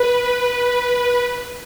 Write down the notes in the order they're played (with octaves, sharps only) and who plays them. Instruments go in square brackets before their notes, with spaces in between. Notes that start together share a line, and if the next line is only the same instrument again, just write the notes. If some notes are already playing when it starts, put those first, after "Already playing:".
Already playing: [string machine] B4